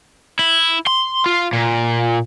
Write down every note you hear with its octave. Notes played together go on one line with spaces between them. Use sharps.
E4
C6
F4
A#2